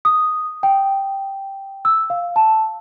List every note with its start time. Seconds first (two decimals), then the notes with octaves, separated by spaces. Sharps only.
0.05 D#6
0.63 G5
1.85 E6
2.10 F5
2.36 A5